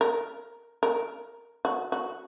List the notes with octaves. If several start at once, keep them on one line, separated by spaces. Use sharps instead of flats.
A#4
A#4
F#4
F#4